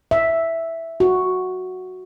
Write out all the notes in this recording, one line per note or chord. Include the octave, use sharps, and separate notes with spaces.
E5
F#4